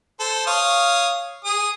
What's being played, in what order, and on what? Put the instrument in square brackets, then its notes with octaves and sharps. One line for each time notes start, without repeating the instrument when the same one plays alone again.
[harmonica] A4 C5
C#5 F5 D#6
G#4 D#6